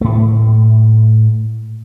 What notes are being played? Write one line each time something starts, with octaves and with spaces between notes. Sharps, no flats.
A2 A3